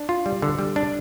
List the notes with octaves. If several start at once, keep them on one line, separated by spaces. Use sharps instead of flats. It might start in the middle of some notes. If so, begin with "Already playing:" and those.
Already playing: D4
F4
G3
D3
G3
D4